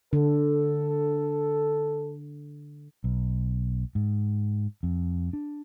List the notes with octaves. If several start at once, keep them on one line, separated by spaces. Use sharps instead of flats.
D3 A4
B1
G#2
F2
D4